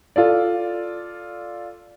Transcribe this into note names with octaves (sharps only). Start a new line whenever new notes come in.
F4 A4 D5